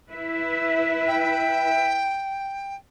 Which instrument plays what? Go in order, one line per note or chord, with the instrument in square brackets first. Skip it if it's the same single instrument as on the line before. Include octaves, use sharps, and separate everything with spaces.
[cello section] E4 B4 E5
[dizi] G5